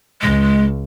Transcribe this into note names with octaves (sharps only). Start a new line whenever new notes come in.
C#2 G#3